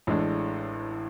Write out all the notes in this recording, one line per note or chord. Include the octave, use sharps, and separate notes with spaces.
A1 A2 G#3 D4